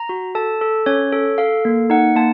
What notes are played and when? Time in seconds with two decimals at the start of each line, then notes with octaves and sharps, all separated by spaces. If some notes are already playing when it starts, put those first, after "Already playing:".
Already playing: A#5
0.09 F#4
0.35 A4 A5
0.61 A4
0.86 C#4 C#5
1.13 A4
1.38 A4 F5
1.65 A#3
1.90 D#4 F#5
2.16 A#3 A5